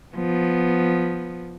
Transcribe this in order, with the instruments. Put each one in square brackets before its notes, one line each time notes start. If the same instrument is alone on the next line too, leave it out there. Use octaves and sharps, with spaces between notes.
[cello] F3 B3